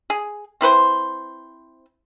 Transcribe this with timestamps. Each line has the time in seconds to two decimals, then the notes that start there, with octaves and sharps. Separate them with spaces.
0.10 G#4
0.61 C4 E4 B4 C5